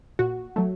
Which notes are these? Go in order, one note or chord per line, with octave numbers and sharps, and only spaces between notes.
A#2 F#4
F#3 A3